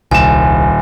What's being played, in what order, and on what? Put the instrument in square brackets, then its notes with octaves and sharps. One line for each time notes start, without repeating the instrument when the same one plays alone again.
[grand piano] D#1 E7 [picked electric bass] C2 [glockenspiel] G#5